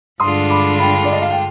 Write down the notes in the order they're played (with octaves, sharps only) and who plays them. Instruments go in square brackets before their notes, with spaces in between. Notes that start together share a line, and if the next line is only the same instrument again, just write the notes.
[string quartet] G2 D3 G#3 D4 F4 [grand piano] C6 D#6
[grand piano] B5 D6
G5 B5
D5
D#5
F5
G5